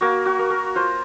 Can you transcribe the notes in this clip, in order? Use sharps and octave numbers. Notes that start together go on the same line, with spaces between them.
A#3 F#4
F#4
A#3
A#4
F4 C5